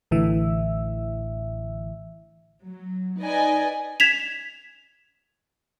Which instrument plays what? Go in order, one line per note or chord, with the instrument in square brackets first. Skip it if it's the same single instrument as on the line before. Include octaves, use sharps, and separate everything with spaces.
[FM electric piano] A1 A2 D3 E3 E5
[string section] F#3
D#4 B4 D5 D#5 G#5
[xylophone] G#6 B6 E7 F7